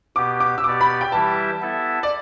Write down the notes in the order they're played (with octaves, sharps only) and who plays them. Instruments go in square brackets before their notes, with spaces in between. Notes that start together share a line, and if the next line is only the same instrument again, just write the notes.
[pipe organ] B2 B3 G4 [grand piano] D6
[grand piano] D6
E6
[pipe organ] B2 B3 G4 D5 [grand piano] D6
[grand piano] B5
G5
[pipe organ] E3 G3 E4 G4 E5 [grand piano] A5
[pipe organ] B3 E4 A4 E5
[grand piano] D5